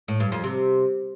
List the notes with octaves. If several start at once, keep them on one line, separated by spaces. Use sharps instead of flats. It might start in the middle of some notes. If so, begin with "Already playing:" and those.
A2
G2
F2
C3